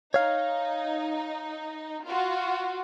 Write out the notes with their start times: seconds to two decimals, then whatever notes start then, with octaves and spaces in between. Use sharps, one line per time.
0.14 D#4 C#5 F5
2.05 F4 F#4